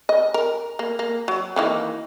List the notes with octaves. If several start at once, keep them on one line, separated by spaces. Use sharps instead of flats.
D#5
A#4
A#3
A#3
F#3
D#3 E3 A#3